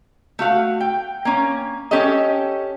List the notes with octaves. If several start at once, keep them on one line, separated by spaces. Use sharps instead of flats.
A3 F#4 F5
G5
A#3 C#4
C#4 G4 A4 C#5 D#5